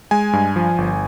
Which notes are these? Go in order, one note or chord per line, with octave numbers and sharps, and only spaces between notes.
G#3 G#5
G2
F3
G1